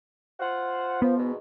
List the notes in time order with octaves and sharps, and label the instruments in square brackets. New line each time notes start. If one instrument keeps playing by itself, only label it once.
[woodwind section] F4 C5 F#5
[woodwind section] F3 [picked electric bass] B3
[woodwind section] E2 G#2 B2